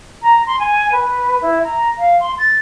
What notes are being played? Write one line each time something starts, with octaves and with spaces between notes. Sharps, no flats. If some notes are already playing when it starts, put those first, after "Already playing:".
A#5
C6
G#5
B4
E4
A#5
F5
C6
A6